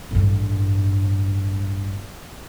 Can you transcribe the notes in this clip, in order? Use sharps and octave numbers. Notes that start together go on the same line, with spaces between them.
A1 G2